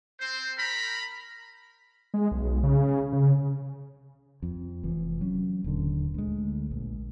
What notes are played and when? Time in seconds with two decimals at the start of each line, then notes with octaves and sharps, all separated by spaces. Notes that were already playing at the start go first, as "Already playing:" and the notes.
0.20 C4 C5
0.58 A#4 A#5 B5
2.14 G#3
2.32 B1
2.63 C#3
3.13 C#3
4.42 F2
4.83 F1 E3 F3
5.21 F#3 C#4
5.64 D#1 D3
6.14 D2 G#3
6.71 A#1